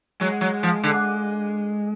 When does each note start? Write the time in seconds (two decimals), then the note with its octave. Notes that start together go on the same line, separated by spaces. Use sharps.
0.21 F#3 G#3
0.41 F#3
0.63 F3
0.84 D3